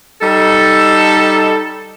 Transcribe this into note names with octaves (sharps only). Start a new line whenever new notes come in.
G3 D#4 A4